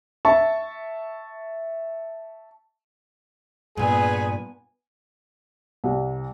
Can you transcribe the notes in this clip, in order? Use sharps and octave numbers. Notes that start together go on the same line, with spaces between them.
E5 A5 C#6
G2 A#2 B3 G#4 G#5
C2